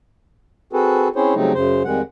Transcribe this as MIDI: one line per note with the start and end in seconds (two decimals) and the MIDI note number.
0.73 1.08 60
0.73 1.08 66
0.73 1.08 68
0.73 1.08 69
0.73 1.08 71
1.16 1.34 60
1.16 1.34 61
1.16 1.34 64
1.16 1.34 68
1.16 1.34 72
1.16 1.34 73
1.35 1.53 49
1.35 1.53 54
1.35 1.53 55
1.35 1.53 57
1.35 1.53 60
1.35 1.53 63
1.54 1.83 42
1.54 1.83 49
1.54 1.83 72
1.84 2.02 41
1.84 2.02 51
1.84 2.02 55
1.84 2.02 56
1.84 2.02 78